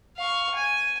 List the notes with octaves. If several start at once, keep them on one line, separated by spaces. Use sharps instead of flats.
F5 C#6
G#5